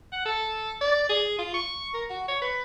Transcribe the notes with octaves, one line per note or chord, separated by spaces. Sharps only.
F#5
A4
D5
G#4
F4
C#6
A#4
F#4
C#5
B4